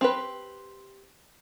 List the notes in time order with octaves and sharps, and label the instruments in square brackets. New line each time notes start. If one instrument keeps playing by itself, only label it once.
[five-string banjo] C4 G4 B4